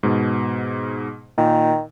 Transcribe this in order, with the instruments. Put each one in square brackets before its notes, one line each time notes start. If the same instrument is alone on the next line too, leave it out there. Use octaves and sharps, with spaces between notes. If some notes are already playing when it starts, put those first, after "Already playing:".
[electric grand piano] G#2 B2
[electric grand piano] A#2 [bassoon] D#3